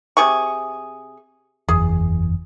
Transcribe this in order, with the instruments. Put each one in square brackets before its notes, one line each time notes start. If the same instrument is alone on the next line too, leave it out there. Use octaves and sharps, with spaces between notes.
[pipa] C3 G#4 C#6
[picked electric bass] F#1 E2 [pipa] G#4